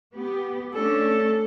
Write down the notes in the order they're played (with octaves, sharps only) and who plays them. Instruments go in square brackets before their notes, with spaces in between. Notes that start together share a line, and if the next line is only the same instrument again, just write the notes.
[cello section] B3 G4
[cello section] A3 C#4 D4 [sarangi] A4